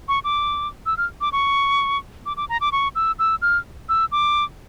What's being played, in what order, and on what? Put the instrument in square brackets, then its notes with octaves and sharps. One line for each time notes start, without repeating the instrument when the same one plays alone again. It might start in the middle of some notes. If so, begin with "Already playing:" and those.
[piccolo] C#6
D6
E6
F6
D6
C#6
D6
D6
A#5
D6
C#6
E6
E6
F6
E6
D6